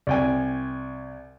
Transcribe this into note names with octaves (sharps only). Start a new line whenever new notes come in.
C2 G5 G#5